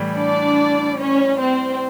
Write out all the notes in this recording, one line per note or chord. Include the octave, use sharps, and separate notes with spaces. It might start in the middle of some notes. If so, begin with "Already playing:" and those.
Already playing: A2 E3 G3
D4 D5
C#4 C#5
C4 C5